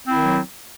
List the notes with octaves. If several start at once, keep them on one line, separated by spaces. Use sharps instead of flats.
D#3 F#3 C4 E4